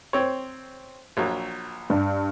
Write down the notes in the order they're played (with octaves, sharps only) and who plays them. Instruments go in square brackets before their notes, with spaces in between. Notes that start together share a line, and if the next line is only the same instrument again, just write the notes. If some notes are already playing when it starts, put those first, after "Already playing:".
[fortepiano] C4 C#5
A#1 F#3
[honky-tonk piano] G2